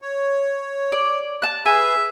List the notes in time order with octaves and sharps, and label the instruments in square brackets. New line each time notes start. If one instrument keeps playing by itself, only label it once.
[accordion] C#5
[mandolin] D5
A5 F#6
[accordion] G#4 B4 [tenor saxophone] E5 [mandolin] G#5